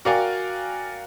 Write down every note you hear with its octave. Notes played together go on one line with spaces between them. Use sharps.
F#4 A#4 D5 F5 G5 G#5